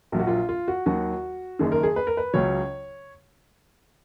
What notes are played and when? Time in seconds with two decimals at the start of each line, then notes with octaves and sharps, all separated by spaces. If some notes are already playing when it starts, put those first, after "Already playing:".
0.12 A#1 A#2 F#3 F4
0.20 F#4
0.27 F4
0.49 F4
0.68 F#4
0.86 D#2 D#3 F#3 F#4
1.59 F#1 F#2 D#3 G#4
1.72 A#4
1.83 G#4
1.96 B4
2.07 A#4
2.17 B4
2.34 C#2 C#3 F#3 C#5